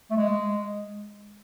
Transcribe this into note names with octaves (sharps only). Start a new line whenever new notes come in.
A3
G#3